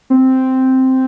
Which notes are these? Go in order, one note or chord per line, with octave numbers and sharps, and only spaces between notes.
C4